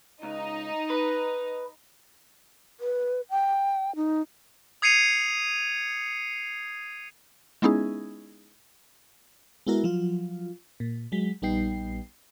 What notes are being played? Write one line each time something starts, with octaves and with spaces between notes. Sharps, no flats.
C#2 D#4
B4
B4
G5
D#4
D#6 G#6 C7 C#7 D#7 F7
G#3 B3 C#4 D#4 E4 G#4
G#3 B3 E4 F#4 A#4
F3 F#3 F4
A#2
F#3 G#3 B6
A#1 G3 B3 D#4 G5 C7